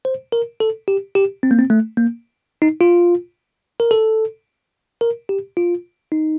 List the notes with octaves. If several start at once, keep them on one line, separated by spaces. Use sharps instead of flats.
C5
A#4
A4
G4
G4
C4
A#3
C4
A3
A#3
D#4
F4
A#4
A4
A#4
G4
F4
D#4